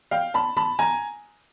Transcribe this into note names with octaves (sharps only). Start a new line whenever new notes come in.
F5 G5
A5 B5
A5 B5
G#5 A#5